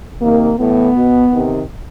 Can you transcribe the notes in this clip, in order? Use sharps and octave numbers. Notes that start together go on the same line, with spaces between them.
C3 D#3 A#3
A2 E3 B3
B2
C3 D#3